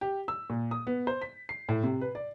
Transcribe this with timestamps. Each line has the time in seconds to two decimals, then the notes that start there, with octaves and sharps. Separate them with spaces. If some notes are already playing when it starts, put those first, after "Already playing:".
0.01 G4
0.28 E6
0.50 A#2
0.71 D#6
0.87 B3
1.07 C5
1.22 B6
1.49 C7
1.69 A2
1.83 C3
2.01 B4
2.15 D5